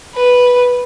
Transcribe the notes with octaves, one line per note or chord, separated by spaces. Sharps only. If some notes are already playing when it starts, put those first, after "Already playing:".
B4